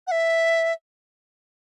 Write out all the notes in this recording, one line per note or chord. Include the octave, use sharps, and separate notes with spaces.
F#5
E5